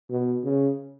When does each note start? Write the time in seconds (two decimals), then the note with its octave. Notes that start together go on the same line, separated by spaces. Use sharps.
0.10 B2
0.44 C#3